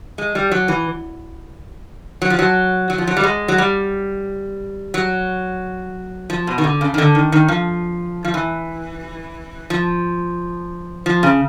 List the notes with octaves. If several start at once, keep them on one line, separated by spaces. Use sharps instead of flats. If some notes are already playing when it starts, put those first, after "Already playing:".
G#3
G3
F#3
E3
F#3
F3
F#3
F#3
F3
F#3
G3
G#3
F#3
G3
F#3
F3
B2
D#3
D3
C#3
D#3
D3
D#3
D#3
F3
F3
E3
F3
F3
C#3